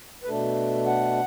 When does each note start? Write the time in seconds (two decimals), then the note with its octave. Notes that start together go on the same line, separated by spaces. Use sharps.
0.24 B4
0.28 B2 A3 D4 A4
0.86 F#5